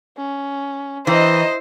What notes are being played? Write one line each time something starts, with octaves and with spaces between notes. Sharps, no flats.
C#4
E3 C5 D#5 G5 A#5